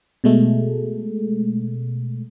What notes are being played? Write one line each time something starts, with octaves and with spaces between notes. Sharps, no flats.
B2 G#3 A3